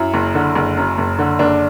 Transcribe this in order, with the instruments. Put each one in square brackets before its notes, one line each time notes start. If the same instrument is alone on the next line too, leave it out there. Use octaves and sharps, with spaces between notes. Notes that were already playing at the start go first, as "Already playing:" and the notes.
Already playing: [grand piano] F#2 E4
F#1
D3
F#1
F#2
F#1
D3
F#1 D4